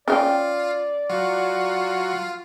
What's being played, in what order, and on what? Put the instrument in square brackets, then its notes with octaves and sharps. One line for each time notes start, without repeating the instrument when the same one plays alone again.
[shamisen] C#4 F5 G5 [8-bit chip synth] F4 [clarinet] D5
[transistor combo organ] F#3 C#6 [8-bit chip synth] F4